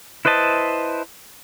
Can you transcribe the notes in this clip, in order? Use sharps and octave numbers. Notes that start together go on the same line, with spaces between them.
E4 B4 C5 D#5 A5